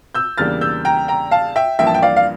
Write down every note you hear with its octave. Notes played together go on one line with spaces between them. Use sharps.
E6 G6
E2 C#3 G3 A#3 D4 F6 A6
E6 G6
G5 A#5
G5 A#5
F5 A5
E5 G5
A1 G2 F3 A#3 E5 G5
A5
G5
D5 F5
F5